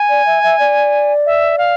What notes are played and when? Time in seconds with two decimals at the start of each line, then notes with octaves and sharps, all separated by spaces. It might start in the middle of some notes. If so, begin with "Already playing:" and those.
Already playing: G#5
0.09 D5
0.26 E5
0.43 E5
0.59 D5
1.26 E5
1.58 F5